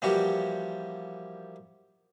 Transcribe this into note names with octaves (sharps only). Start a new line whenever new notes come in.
A#2 E3 F3 G3 F#4 G4